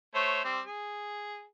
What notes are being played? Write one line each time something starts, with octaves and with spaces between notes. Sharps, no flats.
A3 C5 C#5
G3 C4
G#4